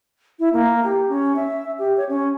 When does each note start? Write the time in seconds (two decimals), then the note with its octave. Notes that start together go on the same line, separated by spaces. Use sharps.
0.39 E4
0.53 A#3
0.84 G4
1.09 C#4
1.36 E5
1.79 G4
1.97 C#5
2.09 C#4